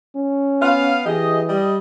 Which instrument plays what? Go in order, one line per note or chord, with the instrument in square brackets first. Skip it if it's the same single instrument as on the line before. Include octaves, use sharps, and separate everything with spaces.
[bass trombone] C#4
[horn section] B3 F5
[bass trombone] E3 [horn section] G4 G#4 D#5
[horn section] G3 D#5